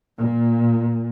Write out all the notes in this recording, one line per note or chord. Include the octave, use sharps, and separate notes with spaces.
A#2